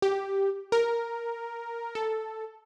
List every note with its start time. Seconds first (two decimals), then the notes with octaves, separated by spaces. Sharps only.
0.02 G4
0.72 A#4
1.95 A4